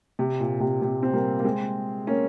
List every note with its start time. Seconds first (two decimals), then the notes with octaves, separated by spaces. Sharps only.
0.19 C3
0.40 A#2
0.60 C3
0.82 C3
1.03 C4
1.13 G3 A#3
1.40 A#3
1.44 G#3 C4
2.07 A#3 C#4